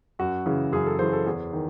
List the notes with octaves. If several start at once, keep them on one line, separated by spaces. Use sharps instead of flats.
F#2 F#4
C#3 E3
F#2 G#4
A4
C#3 E3 C5
A4
E2 G#4
D#3